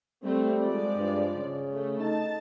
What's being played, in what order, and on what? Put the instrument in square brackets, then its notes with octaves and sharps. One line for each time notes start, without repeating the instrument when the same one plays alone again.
[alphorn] G3 [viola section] A3 C4
[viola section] F3 G#3 D5
[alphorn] G2
C#3
[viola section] A3
[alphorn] D#4 [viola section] A5